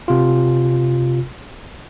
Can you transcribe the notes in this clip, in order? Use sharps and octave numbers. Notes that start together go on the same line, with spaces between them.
C3 F4